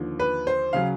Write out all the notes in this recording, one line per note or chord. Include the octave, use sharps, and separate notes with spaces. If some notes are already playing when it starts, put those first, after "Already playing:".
Already playing: D#2 D3 F3
B4
C5
C#3 F#3 F5